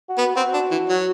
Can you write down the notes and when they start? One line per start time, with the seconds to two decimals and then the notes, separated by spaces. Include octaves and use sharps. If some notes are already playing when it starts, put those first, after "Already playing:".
0.09 F#4
0.18 B3
0.36 C4 F#4
0.54 D4
0.71 E3
0.89 F#3